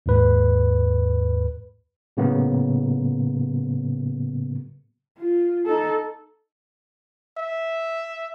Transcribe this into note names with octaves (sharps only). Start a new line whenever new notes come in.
D#2 G#2 B4
A2 C#3 F#3 A#3 B3
F4
D#4 A4
E5